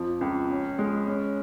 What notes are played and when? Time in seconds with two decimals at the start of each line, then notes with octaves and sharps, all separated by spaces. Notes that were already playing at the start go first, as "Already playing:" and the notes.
Already playing: F2 F3
0.21 C#2
0.50 C#4
0.78 G#3
1.07 C#4